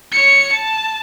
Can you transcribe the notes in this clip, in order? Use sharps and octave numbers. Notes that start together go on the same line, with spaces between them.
C#5 C#7
A5